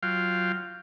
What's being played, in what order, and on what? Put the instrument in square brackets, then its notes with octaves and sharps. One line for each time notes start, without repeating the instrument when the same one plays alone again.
[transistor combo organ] F#3 F4 F5 G5